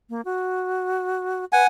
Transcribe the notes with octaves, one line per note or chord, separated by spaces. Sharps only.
A#3
F#4
B4 F#5 G#5